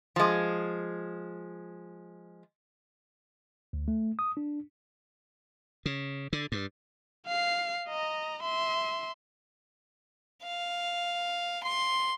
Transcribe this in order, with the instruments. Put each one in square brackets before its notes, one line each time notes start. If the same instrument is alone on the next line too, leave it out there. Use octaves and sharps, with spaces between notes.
[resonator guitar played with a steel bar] F3 G#3
[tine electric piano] D2
A3
D#6
D4
[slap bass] C#3
D3
G2
[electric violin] F5 C7
D#5 A#5
E5 C6
[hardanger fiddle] F5
C6